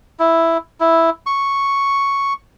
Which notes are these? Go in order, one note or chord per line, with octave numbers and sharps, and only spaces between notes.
E4
E4
C#6